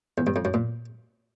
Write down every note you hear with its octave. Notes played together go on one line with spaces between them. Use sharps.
E2
G2
F2
F#2
A#2